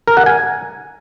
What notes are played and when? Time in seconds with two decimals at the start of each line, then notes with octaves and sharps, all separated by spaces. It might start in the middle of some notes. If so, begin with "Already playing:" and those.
0.08 A#4
0.17 F#5
0.26 G#5